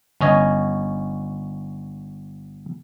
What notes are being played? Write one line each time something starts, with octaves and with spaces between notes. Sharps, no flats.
G1 C#4 D#5 G#5